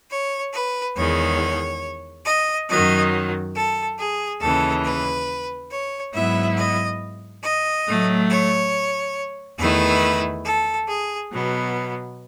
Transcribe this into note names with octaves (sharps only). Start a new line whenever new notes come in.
C#5
B4
E2 D#3 G#3 C#5
D#5
F#2 D#3 F#3 D#5
A4
G#4
D#2 C#3 E3 A4
B4
C#5
G#2 F#3 B3 E4 E5
D#5
D#5
A2 F#3 A3
C#5
E2 D#3 A3 E4 B4
A4
G#4
B2 F#3 B3